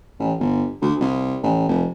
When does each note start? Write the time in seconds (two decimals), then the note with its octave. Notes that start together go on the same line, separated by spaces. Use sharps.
0.19 A1
0.39 G1
0.81 D2
1.00 C2
1.43 A1
1.68 F1